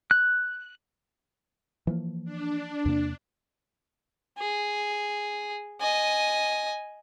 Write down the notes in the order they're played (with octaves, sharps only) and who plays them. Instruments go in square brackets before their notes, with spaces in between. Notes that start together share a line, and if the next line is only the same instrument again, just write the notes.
[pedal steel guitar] F#6
[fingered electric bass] E3 F3 A#3
[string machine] D4
[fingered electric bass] E2 C3 A#3
[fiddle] G#4
D#5 G#5